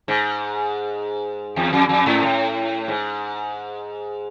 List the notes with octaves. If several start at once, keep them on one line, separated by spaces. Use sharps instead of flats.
G#2
E2
F2
F2
G#2
A2
G#2